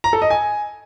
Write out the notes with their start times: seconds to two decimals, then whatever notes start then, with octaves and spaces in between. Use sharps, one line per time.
0.04 A#5
0.13 A4
0.22 D#5
0.30 G#5